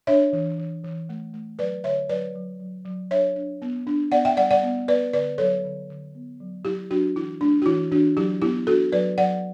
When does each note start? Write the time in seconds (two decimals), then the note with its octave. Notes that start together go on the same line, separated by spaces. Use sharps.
0.07 D4 C#5 E5
0.33 E3
0.59 E3
0.84 E3
1.09 A3
1.34 A3
1.59 F#3 B4 D5
1.84 D3 C#5 E5
2.09 F#3 B4 D5
2.35 F#3
2.60 F#3
2.85 F#3
3.11 D4 C#5 E5
3.36 D4
3.62 B3
3.87 D4
4.12 B3 D5 F#5
4.25 E5 G5
4.37 G3 D5 F#5
4.51 D5 F#5
4.63 B3
4.88 B3 B4 D5
5.13 D3 B4 D5
5.38 F#3 A4 C#5
5.64 D3
5.90 D3
6.15 B3
6.40 F#3
6.65 F#3 E4 G4
6.91 F#3 D4 F#4
7.15 E3 E4
7.41 A3 D4
7.62 F#4
7.66 E3 E4
7.92 E3 D4 F#4
8.17 F#3 E4 G4
8.42 B3 E4 G4
8.67 D4 F#4 A4
8.92 F#3 B4 D5
9.18 F#3 D5 F#5